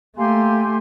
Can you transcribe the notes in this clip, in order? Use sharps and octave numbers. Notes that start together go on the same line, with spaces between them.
A3 A#3 G4 G#5 C6